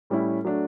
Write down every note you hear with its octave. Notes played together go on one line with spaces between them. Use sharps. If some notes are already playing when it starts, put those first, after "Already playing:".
A2 G3 C#4 E4
F#3 A3 D4